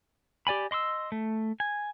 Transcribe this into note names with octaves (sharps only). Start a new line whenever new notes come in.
G4 D5 G#5 B5
D#5 C6 C#6 E6
A3
G#5